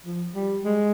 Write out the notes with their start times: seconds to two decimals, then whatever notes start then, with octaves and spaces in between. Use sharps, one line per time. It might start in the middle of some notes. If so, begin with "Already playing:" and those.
0.06 F3
0.35 G3
0.65 G#3